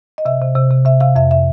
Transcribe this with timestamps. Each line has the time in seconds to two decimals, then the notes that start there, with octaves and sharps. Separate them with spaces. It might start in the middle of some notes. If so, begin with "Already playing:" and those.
0.18 D#5
0.25 C3 E5
0.41 C3
0.56 C3
0.71 C3
0.86 C3 E5
1.00 C3 F5
1.16 F2 E5
1.31 E5